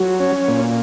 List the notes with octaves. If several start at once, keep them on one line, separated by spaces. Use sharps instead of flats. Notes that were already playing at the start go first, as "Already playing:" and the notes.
Already playing: F#3 F#4
C#4
A#2